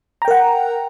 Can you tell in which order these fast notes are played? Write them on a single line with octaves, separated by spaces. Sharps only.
A#5 G5 A#4 F#5